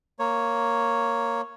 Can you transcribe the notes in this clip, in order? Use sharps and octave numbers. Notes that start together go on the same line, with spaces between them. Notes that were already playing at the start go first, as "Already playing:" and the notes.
A#3 C#5